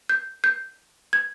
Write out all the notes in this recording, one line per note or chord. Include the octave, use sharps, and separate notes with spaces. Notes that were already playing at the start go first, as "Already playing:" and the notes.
G6
G6
G#6